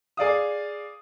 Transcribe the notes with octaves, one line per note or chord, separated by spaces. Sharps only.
G#4 D5 F5 D#6